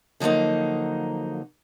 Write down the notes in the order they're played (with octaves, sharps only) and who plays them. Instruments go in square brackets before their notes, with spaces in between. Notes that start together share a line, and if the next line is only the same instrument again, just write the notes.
[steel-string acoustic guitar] D3 F3 F#3 A#3 D#4